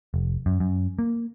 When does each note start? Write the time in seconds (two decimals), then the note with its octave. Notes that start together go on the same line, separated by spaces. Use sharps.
0.14 F1
0.46 F#2
0.60 F#2
0.99 A#3